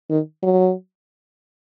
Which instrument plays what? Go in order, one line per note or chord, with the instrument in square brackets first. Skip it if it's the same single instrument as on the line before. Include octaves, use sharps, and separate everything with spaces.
[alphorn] D#3
F#3